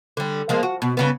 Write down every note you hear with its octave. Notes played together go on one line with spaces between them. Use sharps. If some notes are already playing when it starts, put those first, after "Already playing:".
D3 G3
F3 G#3 A#3
F#4
B2
G2 C#3 B3